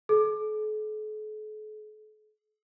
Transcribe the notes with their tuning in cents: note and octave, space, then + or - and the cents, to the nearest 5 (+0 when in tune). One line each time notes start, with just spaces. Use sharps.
A4 -45